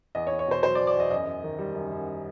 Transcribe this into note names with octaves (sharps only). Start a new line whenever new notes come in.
E2 D#5
C#5
E2
C#5
B2 C5
F#3 C5
D5
E2
D5
E2 D#5
F#2 D#5
F#2
D#3
G3
F#2
F#2